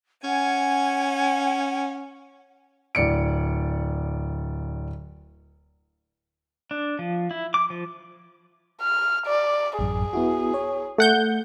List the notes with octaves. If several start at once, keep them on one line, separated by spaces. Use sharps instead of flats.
C#4 F#5 G#5
D1 D5 C#7 D7
D4
F3
E4
D6
F3
F6
D5
A1 F#2 G#4
B3 E4 F#4
C#5
A3 A4 F#5 G6